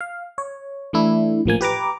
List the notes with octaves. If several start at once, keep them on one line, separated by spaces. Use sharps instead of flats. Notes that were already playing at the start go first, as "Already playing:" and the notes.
F5
C#5
E3 A3 D4 E4
A1 F3 A#3 G#5
G4 B4 A#5 D6